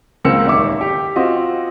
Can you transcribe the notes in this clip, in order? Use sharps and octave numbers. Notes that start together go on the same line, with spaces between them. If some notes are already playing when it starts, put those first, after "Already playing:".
C#2 A#3 C4 E6 C#7
D#1 G#1 E5 D6
G4
C4 F4 F#4 D#5